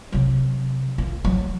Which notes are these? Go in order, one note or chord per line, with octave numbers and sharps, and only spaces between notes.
C3 F#3
D#3 F4
F3 F#3